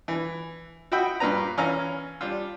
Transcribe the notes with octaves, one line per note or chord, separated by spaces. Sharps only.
E3
F#4 D#5 E5 G5 B5
G2 A#2 B4 A#5
E3 C#4 F5 A#5 F6
G3 D4 F4